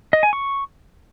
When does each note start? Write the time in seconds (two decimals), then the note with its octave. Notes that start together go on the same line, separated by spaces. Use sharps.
0.13 D#5
0.23 G#5
0.33 C#6